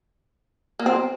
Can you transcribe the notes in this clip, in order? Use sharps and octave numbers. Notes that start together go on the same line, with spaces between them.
A#3
C4